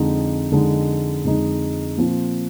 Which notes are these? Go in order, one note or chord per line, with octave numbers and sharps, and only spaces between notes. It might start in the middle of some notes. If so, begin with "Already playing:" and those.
Already playing: F2 D3 G#3 D#4
F2 D3 G#3 D#4
F2 D3 G#3 D#4
A#2 F3 C4 F4